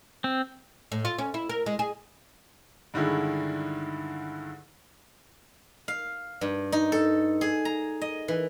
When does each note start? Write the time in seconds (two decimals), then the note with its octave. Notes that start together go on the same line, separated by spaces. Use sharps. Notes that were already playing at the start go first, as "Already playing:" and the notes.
0.24 C4
0.92 A2
1.05 F4
1.18 C#4
1.34 E4
1.49 A#4
1.66 G#3
1.79 G#4
2.94 G2 D3 D#3 G#3 E4
5.88 F5
6.41 G2
6.72 D#4
6.92 A4
7.41 G#4
7.65 A#5
8.01 D#5
8.28 E3